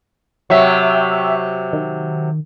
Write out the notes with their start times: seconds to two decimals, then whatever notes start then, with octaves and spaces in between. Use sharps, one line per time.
0.50 C3 F#3 E5 G5 C#6
1.73 D#3